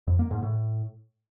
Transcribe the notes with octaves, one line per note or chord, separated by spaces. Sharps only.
F2
A#3
G#2
A2